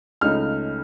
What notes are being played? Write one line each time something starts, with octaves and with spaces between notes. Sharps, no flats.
C#2 C#3 A3 D#4 F6